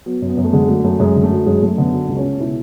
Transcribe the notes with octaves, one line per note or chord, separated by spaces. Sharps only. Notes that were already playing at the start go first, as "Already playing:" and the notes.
F#3 B3
F#2
B3
F#2
A3
D3 G#3
F#3 A3
F#2 A3
F#2 G#3
D3
A3
F#3
F#2 G#3
F#2 A3
D3 B3
F#3
C#2
C#4
C#2
B2 E4